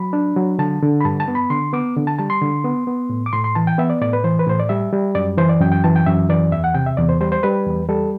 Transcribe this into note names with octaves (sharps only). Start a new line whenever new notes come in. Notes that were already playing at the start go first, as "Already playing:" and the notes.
Already playing: F#3 B5
D4
F#3
D3 A5
D3
B5
G2 A5
A5
B3
B5
D3 C6
B3 D6
D3
A5
G3 A5
C6
D3
B3
B3
A2
D6
A2 C6
C6
E3 A5
G5
B3 E5
D5
A2 D5
B4
E3 C5
B4
A2 C5
D5
G3 E5
G3
F#2 D5
E3 C5
D5
F#2 G5
G5
E3 A5
G5
F#2 E5
E3 D5
E2 E5
F#5
C3 G5
E5
E2 D5
C5
G3 C5
C5
G3 B4
E2
G3 A4